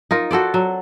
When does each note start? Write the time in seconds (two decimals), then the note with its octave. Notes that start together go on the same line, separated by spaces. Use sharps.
0.11 D#4 F4 A#4
0.31 F#4 A4 C5 D5
0.54 F#3